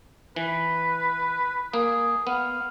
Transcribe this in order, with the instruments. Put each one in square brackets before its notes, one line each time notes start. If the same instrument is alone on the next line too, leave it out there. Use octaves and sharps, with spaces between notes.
[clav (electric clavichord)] E3 [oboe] B4
[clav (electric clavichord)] A#3 [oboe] G#4
[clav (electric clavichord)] B3 [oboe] F5